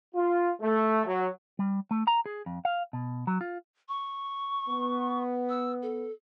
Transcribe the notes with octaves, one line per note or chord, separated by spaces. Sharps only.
F4
A3
F#3
G3
A3
A#5
G#4
F2
F5
B2
F#3
F4
C#6
B3
E6
A4